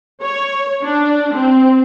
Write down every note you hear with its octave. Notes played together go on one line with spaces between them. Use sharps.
C#5
D4
C4